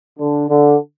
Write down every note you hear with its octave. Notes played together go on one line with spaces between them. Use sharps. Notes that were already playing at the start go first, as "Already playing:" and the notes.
D3
D3